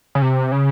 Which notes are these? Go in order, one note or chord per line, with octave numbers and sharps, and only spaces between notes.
C#3
C3
C#3